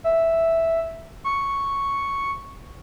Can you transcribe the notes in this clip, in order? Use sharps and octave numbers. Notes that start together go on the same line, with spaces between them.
E5
C#6